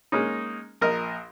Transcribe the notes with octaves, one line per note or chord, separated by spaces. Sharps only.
G#3 A#3 C#4 D#4
A#1 A#4 D#5 F6